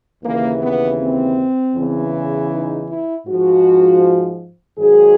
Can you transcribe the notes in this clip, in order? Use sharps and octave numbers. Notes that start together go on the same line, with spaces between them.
D#2 C#3 E3 A#3
B3
C4
E2 C#3 E3
D#4
E4
G#2 F3 F#4
G#2 D#3 F#3 G#4